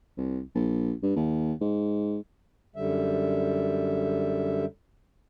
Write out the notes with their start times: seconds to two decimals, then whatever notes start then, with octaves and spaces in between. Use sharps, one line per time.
0.17 C2
0.55 A#1
1.03 G2
1.16 D#2
1.61 G#2
2.76 F#2 D3 G3 E5